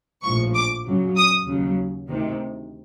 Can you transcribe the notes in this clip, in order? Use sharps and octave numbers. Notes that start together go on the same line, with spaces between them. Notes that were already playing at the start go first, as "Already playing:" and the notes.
A#1 A2 F3 C#6
D6
F#2 C#3 F#3
D#6
D#2 C#3 F#3
D2 C3 D#3